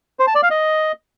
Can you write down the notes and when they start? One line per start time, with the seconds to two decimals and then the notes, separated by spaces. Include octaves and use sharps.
0.19 C5
0.27 A5
0.35 D5
0.43 F5
0.50 D#5